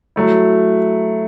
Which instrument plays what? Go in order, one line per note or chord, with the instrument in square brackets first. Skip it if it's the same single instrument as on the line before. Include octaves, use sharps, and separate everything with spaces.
[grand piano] F#3 A3 E4